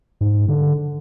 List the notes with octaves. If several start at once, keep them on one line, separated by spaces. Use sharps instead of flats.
G#2
D3